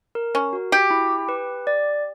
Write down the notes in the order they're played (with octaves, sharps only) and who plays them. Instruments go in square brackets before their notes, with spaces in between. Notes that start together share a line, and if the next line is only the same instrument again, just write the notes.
[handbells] A#4
[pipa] C#4
[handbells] F#4
[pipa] G4
[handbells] E4
B4
D5